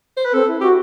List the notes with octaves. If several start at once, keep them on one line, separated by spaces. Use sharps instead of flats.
C5
B4
C4 A4
E4
F#4 G4